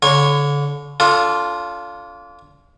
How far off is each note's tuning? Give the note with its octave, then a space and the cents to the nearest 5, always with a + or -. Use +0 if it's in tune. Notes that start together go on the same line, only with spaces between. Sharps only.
D3 -35 C#5 +0 C#6 -35
D4 -40 F4 +0 A4 +0